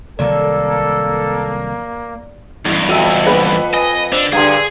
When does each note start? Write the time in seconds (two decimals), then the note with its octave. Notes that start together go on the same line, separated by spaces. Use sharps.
0.19 C2 D#3 F#3 A#3 A4 D5
2.66 A1 E2 G2
2.89 F2 F#4 E5 E6 D#7 F7
3.27 A#3 B4 C5 F#5
3.74 D#5 G#5
4.13 D3 C5
4.33 G2 D3 G#4 F5 A#5 C6